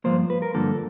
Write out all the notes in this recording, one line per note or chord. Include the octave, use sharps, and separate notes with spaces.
G2 D3 F3 A#3 C5
B4
A#4
G2 D3 F3 A#3 A4